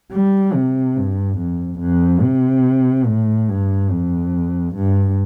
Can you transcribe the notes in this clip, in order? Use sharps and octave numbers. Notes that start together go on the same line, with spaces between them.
G3
C3
G2
F2
F2
C3
A2
G2
F2
G2